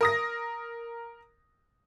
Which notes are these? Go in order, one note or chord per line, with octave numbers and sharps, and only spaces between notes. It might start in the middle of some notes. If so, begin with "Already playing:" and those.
A#4 D#6 A#6